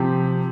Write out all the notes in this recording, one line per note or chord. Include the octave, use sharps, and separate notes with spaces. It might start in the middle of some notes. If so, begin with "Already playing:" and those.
Already playing: C3 F3 C4 G4